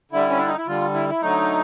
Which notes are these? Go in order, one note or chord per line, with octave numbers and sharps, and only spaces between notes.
D3 G3 E4
C#4
D4
D#4
E4
D3 G3 F4
E4
E4
D3 F#3 A3 D#4